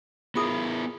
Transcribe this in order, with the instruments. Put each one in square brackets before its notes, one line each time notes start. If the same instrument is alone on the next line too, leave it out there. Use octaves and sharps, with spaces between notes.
[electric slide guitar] B3 E4 A#4 [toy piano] F4 G#4 D#6